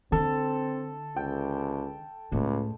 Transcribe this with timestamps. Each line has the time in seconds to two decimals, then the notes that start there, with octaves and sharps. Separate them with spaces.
0.12 D3 C4 A4
1.16 C#2 G5
2.32 C#2 A2